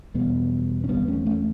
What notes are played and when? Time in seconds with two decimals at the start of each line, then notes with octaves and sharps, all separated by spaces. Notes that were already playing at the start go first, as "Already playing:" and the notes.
0.14 E2 B2 G3 B3
0.84 C#4
0.89 E2 C#3 G3 B3
1.08 A3 C#4
1.26 A3 C#4